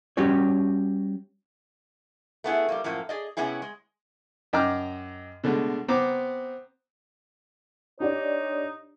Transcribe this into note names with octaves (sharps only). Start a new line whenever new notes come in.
G3 C#4 F#4 G4 C#5
A3 B3 E4 G#4
G3 A#3
F#2 A2 F3 A#3
G#4 D5 D#5
C3 B3 C#4 E4 G#4
G#3
F#2 D#5 G5 A#5 D6 F6
B2 D3 G#3 A3
B3 C4 C5 A#5 D6
D4 D#4 G4 C#5 D5